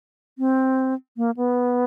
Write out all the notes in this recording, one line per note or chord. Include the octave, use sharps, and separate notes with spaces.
C4
A#3
B3